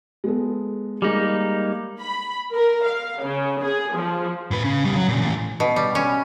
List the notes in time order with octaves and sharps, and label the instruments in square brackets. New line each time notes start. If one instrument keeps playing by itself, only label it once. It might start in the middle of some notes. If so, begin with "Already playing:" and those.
[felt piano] G#3 B3 A4
[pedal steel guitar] G3 A#3 D#4 [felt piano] G#3 G#4
[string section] B5
A#4
F5
C#3
G#4
F3
[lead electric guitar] A2 B4
C#3
C#3 G3
F#3
A#2 C#3
A2 E3
[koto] B2
G3
C#4